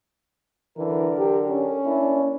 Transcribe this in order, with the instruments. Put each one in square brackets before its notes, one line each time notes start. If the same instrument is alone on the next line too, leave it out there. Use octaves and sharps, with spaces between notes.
[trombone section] F#2 D3 A#4 [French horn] E3
[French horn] G4
C#4
[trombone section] A#3 D4 E4